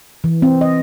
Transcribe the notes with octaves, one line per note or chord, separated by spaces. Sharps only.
E3
C4
D#5